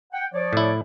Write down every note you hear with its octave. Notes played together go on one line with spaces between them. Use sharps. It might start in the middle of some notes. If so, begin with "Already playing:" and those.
F#5 G5
F3 C#5 D5
A2 E4